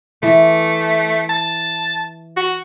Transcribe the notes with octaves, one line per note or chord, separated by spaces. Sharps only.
E3 A3
A5
F#4